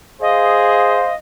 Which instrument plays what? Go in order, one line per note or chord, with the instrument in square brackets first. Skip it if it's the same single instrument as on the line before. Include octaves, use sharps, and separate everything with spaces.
[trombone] G#4 [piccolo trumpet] C5 [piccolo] D#5 [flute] F5